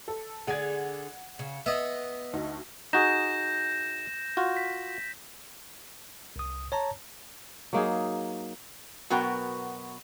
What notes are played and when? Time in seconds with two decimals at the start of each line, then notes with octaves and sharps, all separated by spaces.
0.08 A4
0.47 D3 G#4 D5 F#5 G#6
1.39 C#3
1.66 B3 D#5 E5
2.33 D2 D#4 F#4
2.93 D#4 F#4 G#4 G6 A#6 E7
4.37 F4 F#4
4.57 B6
6.36 C2 D#6
6.72 C#5 A5 A#5
7.73 F#3 A#3 D#4 G#4
9.10 B2 F#3 B3 F#4 A#4 G5